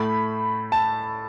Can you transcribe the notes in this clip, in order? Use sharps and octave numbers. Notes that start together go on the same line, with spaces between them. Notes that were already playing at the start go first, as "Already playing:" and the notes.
Already playing: A2 A3 B5
A5